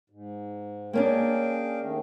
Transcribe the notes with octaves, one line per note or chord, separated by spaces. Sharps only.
G#2
A#3 C#4 D4 G#4 F5 G5
D#2 D#3 A3